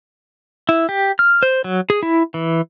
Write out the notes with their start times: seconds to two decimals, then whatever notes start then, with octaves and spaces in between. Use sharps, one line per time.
0.69 E4
0.89 G4
1.19 F6
1.43 C5
1.64 F#3
1.90 G#4
2.03 E4
2.34 E3